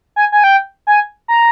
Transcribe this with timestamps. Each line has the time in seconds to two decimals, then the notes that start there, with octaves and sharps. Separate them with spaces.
0.16 G#5
0.32 G#5
0.44 G5
0.87 G#5
1.28 A#5